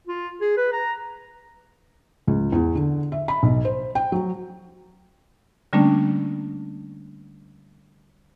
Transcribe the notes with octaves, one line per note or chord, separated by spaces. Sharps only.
F4
G#4
B4
A#5
C#2
E2
D3
E5
B5
B1
C5
G5
F#3
D3 G3 A3 A#3 C#4 D4